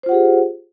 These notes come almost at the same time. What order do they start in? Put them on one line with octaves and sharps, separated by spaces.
C5 F4 F#5 G4 G#4